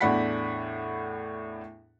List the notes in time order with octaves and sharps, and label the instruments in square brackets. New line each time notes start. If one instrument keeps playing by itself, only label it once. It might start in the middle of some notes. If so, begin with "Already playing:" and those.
[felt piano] E2 A2 D4 F#5 B5 B6